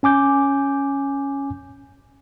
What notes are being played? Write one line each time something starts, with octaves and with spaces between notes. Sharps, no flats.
C#4 G#5 D6 G6